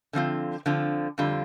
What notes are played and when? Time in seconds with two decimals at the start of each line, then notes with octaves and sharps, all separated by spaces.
0.13 D3 F3 C4 F4
0.66 D3 F3 C4 F4
1.18 F2 D3 G3 F4